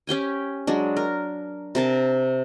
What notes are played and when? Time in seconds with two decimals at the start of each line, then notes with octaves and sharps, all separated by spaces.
0.07 C#4 G4 G5 G#5
0.67 F#3 G#3 D4
0.97 A#4
1.75 C3 A#4 A5